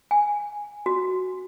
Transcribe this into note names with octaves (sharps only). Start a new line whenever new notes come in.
G#5
F#4